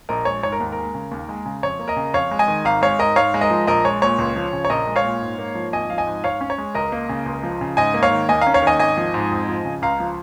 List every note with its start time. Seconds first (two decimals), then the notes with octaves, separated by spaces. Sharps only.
0.09 A#1 A#4 D#5
0.25 G#3 C#5
0.43 G#2 C#5
0.52 A#4
0.60 D#2
0.72 A#4
0.78 G#3
0.94 C#3
1.11 D#2
1.29 G#3
1.46 C#3
1.62 F2 C#5
1.79 A#3
1.88 A#4 D#5
1.96 C#3
2.14 F2 C#5 F5
2.31 G#3
2.39 D#5 G#5
2.48 D#3
2.65 G#1 F5 A#5
2.82 G#3 C#5 F5
2.99 G#2 A#4 D#5
3.16 G#2 C#5 F5
3.34 G#3
3.41 A#4 D#5
3.50 F3
3.67 A#1 A#4 D#5
3.85 G#3 C#5
4.02 A#2 C#5
4.18 C#2
4.36 F3
4.53 C#3
4.65 C#5
4.69 A#1 A#4 D#5
4.87 G#3
4.96 C#5 F5
5.04 A#2
5.21 G#2
5.39 A#3
5.55 F3
5.73 G#1 D#5 G#5
5.90 F3 F5
5.98 D#5 G#5
6.07 G#2
6.24 G#2 C#5 F5
6.41 C#4
6.50 C#5
6.58 G#3
6.75 C#2 A#4 D#5
6.92 A#3
7.09 C#3
7.26 C#2
7.43 F3
7.61 C#3
7.77 G#2 D#5 G#5
7.94 A#3
8.03 C#5 F5
8.11 D#3
8.29 D#2 D#5 G#5
8.41 C#4 F5 A#5
8.54 C#5 F5
8.62 D#3 D#5 G#5
8.79 G#1 D#5 G#5
8.97 F3
9.14 G#2
9.31 F2
9.48 F3
9.65 C#3
9.82 C#2 F5 A#5
10.00 F3